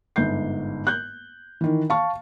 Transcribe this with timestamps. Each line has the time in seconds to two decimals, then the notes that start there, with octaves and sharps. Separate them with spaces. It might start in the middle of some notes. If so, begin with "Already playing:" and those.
0.16 G1 G#2 G6 C7
0.87 F#6 G6
1.61 D#3 E3
1.90 F5 A5 C#6